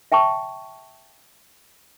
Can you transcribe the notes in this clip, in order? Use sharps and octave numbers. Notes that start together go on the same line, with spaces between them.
E5 G5 A5 C#6